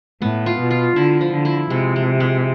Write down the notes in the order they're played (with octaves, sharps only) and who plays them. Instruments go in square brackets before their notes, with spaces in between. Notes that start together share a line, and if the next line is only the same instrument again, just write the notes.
[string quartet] A2 [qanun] B3
[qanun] F4
[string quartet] B2
[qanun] F4
[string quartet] D3 [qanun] E4
[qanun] F3
[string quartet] D3
[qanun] E4
[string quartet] C3 [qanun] G#3
[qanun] G#3
G#3